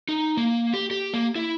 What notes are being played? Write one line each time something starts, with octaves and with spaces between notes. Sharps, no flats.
D#4
A#3
G4
G4
A#3
E4